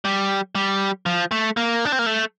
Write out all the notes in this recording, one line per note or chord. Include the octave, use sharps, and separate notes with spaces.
G3
G3
F3
A3
A#3
D4
C4
A#3
A3